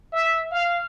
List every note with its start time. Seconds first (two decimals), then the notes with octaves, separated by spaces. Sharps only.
0.12 E5
0.51 F5